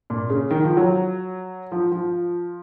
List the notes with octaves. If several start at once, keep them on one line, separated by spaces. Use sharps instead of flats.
A#2
C#3
D#3
F3
F#3
F3
F3